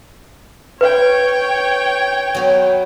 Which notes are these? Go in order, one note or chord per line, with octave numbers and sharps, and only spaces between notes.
B4 C#5 G5
F#3 B3